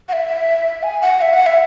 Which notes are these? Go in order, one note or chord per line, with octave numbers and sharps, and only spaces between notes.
F#5
E5
G#5
F#5
E5
F#5
E5